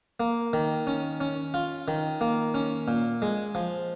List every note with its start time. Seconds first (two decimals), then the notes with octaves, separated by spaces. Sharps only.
0.20 A#3
0.53 D#3
0.87 C#4
1.20 C#4
1.54 F4
1.88 D#3
2.21 A#3
2.54 C#4
2.88 A#2
3.22 G#3
3.55 F3